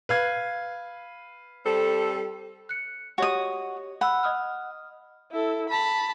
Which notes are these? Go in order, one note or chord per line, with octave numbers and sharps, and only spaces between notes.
B4 F5 G#6
G3 C4 A4
F#6 C#7
F#4 G4 C#5 D#5 D#6
F#5 B5 E6
D#5 D#6 F6
E4 A4
A5 B5